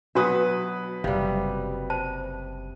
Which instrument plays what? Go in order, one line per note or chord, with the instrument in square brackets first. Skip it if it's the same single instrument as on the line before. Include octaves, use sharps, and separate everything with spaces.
[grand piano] B2 B4 D#6 [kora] F#3 E5 [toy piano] D4 F#4
[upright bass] F#1 [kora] C3 G3 [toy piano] F5
[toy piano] C5 A5